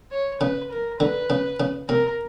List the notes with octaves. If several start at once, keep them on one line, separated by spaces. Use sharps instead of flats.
C#5
C#3 B4
A#4
D3 B4
C#3
C#3
C3 A#4